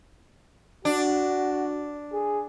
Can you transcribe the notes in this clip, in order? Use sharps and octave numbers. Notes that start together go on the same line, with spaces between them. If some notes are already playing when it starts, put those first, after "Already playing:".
D4 F#4
G#4